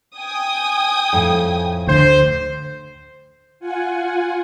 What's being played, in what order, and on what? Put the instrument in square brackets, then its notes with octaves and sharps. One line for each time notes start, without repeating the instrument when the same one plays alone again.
[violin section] G5 G#5 D#6
[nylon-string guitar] F2 A2
[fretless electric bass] D2 D3 [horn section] C5
[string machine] F4 F#5 G#5